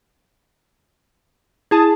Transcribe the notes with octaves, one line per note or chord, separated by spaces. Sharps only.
E4 G#4 A5 D#6